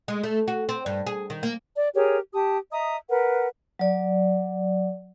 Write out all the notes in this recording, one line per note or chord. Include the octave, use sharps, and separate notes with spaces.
G#3
A3
F#4
C4
G2
G#4
D#3
A#3
D5
G4 G#4 A#4 C#5
G4 A5 D#6
D#5 E5 A#5 D#6
A#4 B4 F#5
F#3 D5